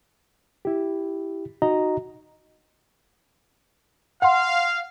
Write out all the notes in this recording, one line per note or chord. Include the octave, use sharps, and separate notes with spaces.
E4 G4
D#4 F#4 D#5 A#5
F5 F#5 C6